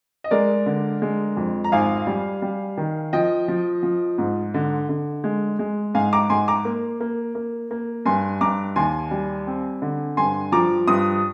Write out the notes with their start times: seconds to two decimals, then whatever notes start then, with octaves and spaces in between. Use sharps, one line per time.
0.24 D#5
0.31 G#3 A#4 D5
0.66 D3
1.02 G#3
1.37 F2
1.64 A#5
1.72 G#1 F5 G#5
2.07 G3
2.42 G3
2.77 D#3
3.13 F3 D#5 G5
3.48 F3
3.83 F3
4.18 G#2
4.54 D3
4.89 D3
5.24 G#3
5.59 G#3
5.94 G#2 F5 G#5
6.13 A#5 D6
6.30 G#2 G#5 C6
6.48 A#5 D6
6.65 A#3
7.00 A#3
7.35 A#3
7.71 A#3
8.06 G2 G#5 C6
8.41 G2 A#5 D6
8.76 D#2 G#5 C6
9.11 G3
9.47 C4
9.82 D3
10.17 G2 G#5 C6
10.52 F3 A#5 D6
10.87 G2 C6 D#6